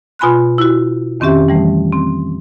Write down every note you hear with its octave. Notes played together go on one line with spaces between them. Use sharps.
B2 F4 G#5 B5 C6 F#6
E4 F#4
F2 D#3 C4 C#4 G4 E5
E3 G3 A3
C4